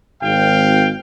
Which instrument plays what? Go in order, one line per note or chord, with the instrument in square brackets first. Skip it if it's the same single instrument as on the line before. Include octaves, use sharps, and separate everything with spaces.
[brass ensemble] G#1 [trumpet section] F5 G5